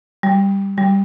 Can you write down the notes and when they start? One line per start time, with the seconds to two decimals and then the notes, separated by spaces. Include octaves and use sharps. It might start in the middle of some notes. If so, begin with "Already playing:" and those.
0.23 G3
0.78 G3